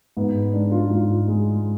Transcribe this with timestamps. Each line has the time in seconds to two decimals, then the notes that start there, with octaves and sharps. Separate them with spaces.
0.17 G#2 B3
0.53 G#3 D4
0.71 F4
0.90 G#2 F4
1.28 G#3